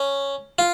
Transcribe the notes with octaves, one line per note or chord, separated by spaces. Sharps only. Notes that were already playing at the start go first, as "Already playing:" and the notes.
Already playing: C#4
F4